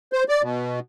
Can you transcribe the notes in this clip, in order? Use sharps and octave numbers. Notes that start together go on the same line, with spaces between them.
C5
D5
B2